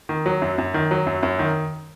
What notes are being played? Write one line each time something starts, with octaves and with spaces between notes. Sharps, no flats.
D#3
F#3
F#2
F#2
D#3
F#3
F#2
F#2
D#3